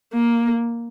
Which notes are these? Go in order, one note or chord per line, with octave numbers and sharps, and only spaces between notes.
A#3